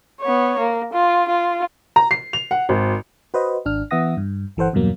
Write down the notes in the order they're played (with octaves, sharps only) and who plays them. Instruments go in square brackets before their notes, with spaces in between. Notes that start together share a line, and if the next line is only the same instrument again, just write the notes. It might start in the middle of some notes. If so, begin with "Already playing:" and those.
[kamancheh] B3 C#5
A#3
F4
F4
[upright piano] A#5
C7
F7
F#5
G#1
[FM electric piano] F#4 B4 C5 D#5
G#1 D4 F6
E3 B3 E5 F#5 D#6 A#6
G2
G1 E3 A4 C5 F#5
E2 G2 B2 F#3 A#3